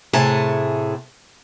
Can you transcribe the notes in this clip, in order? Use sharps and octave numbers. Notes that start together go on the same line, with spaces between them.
A2 C3 A3 G#4 G#5 A5